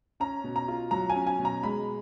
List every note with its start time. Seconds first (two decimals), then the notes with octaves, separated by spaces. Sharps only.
0.20 C#4 A#5
0.44 B2
0.56 A#5
0.68 F4
0.91 F#3 A#5
1.10 G#5
1.16 C#4
1.27 G#5
1.39 B2
1.45 A#5
1.63 G#3 B5